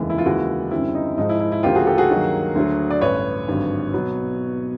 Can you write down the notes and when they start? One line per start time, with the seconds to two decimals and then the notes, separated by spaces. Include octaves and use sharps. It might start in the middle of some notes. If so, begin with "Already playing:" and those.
Already playing: F1 D#2 C#3 E3 G#3
0.10 E4
0.18 F4
0.25 D#2 C#3 E3 G#3 E4 F#4
0.71 F#2 D3 G3 C4 E4
0.94 D#4
1.17 G#2 F3 G#3 D#4
1.29 E4
1.40 E4
1.52 E4
1.63 D2 C#3 F3 A#3 F4 G4
1.75 F#4 G#4
1.86 G4 A4
1.98 F#4 G#4
2.09 G2 D#3 F#3 A#3
2.55 D2 D3 F#3
2.90 D5
3.01 A1 G2 D3 B4 C#5
3.48 G#1 G2 D3 F#3
3.93 B2 F#3 B3